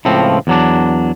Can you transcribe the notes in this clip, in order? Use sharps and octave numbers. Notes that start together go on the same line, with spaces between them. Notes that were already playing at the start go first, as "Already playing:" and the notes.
C#2 A2 F3 C4
E2 F#3 D4